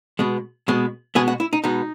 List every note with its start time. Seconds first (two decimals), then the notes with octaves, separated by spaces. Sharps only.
0.19 B2 G#3 B3
0.68 B2 G#3 B3
1.15 B2 G#3 B3 G#4
1.28 F#4
1.40 E4
1.53 D#4
1.64 B2 G#3 B3 D#4